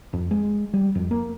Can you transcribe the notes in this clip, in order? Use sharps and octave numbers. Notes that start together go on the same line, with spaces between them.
F2
G#3
G3
F2
A#3